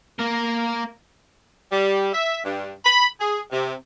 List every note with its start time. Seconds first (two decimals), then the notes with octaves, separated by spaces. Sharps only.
0.19 A#3 A#4
1.72 G3
2.13 E5
2.45 G2
2.85 B5
3.20 G#4
3.52 C3